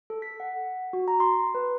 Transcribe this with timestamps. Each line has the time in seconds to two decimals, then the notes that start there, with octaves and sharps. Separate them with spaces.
0.10 A4
0.22 B6
0.40 F#5
0.93 F#4
1.08 A#5
1.20 C6
1.55 B4